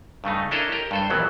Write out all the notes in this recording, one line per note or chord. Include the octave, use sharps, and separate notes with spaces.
G2 C#3 A3 D#4
C#4 D4 E4 A4 A#4 D#5
G4 A#4 D#5
G2 A4 C5
A#1 D#2 E3 F#3 B3